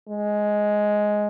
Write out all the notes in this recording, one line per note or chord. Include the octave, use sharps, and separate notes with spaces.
G#3